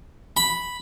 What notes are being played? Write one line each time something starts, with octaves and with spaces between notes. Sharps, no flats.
B5